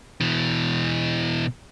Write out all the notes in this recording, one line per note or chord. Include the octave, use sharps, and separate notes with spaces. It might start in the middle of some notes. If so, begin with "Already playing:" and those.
B2 E3